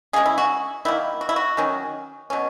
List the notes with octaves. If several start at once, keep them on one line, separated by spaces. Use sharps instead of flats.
C#3 G#3 C#4 G#4
E4
F#4
D#3 F#3 A#3 E4
F#4
E4
F#4
D#3 F#3 C#4
B2 F#3 C#4